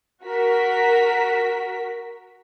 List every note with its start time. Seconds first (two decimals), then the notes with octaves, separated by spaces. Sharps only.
0.23 F#4 A#4 B6